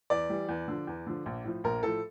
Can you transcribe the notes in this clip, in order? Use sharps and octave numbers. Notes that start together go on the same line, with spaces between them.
E2 D5
E3 G3
E2
D3 F3
E2
D3 F3
A#1
A2 F3
A#1 A#4
A2 F3 A4